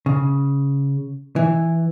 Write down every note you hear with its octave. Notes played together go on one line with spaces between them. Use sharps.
C#3
E3